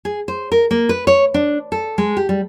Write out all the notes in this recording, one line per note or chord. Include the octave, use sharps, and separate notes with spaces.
G#4
C5
A#4
A#3
B4
C#5
D4
A4
G#3
G4
G3